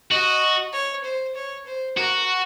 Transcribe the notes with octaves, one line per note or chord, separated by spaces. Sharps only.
F#4 D#5
C#5
C5
C#5
C5
F#4 A#4